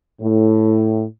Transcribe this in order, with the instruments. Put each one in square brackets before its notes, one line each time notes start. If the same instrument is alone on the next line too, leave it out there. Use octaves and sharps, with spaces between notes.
[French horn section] A2